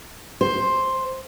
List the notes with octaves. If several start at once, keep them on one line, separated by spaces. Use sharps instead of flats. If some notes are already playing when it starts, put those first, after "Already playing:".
C5